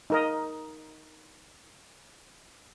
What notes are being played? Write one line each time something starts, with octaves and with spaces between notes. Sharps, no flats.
D#4 A#4 D#5